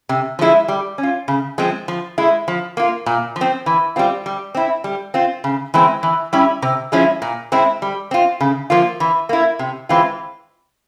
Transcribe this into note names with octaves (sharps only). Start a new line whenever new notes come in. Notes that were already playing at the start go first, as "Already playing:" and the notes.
C3
F3 G#3 E4
G3
C#4
F4
C#3
F3 G#3 C4
F3
G#3 E4
F3
A#3 F4
A#2
F3
C4
E3
G3 C4 F4
G3
C4 E4
G3
C4 F4
C#3
E3 G#3 C4
E3
G3 C#4 E4
C3
F3 G#3 C#4 E4
A#2
G#3 C4 E4
G3
C4 F4
C#3
F3 A#3 F4
E3
A#3 E4
C3
E3 G#3 C4 F4